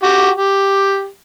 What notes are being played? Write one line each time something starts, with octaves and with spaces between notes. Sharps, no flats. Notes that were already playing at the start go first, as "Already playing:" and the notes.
F#4 G4
G4